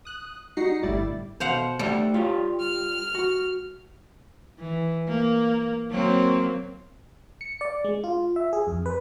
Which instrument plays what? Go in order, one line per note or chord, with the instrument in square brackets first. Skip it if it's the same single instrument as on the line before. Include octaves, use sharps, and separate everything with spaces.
[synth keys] D#6 F#6
G3 D#4 F#4 A#6 C7 C#7
G1 A2 G3 E4 D5 A6
[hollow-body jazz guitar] B2 [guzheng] C5 F5 F#5
[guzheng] G3 [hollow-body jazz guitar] A3 E5 F#5
[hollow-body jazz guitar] F4 G4 C#5
[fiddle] F6
[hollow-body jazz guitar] F#4
[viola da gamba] E3
A#3
F#3 A#3 C4
[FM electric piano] C#7
D5
G#3
F4
E5
G#4
F2
B4